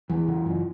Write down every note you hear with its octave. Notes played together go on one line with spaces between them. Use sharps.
E2 E3
C#3
F#2